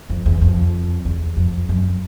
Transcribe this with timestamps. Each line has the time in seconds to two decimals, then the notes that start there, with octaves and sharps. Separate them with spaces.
0.10 F2
0.26 E2
0.41 F2
1.05 E2
1.37 F2
1.69 F#2